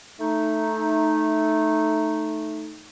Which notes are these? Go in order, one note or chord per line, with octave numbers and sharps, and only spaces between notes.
A3 D#4